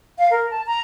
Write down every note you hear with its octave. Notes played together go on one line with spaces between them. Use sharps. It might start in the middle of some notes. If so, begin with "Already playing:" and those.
F5
A#4
A5
A#5